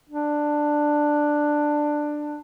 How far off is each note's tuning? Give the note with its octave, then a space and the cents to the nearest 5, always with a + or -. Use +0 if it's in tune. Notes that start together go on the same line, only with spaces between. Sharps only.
D4 +10